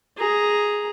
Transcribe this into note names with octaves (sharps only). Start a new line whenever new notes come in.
G#4 A#5